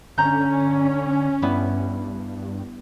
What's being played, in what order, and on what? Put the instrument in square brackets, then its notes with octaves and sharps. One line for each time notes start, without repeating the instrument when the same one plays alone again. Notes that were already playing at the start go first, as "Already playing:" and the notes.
[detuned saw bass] D3 [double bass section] C#4 [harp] A#5 G6
[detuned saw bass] G2 [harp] G3 B3 E4